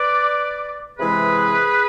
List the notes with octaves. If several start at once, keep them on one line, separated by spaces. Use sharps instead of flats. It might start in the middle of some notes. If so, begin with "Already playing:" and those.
Already playing: B4 D5
C3 E3 G#3 G#4 B4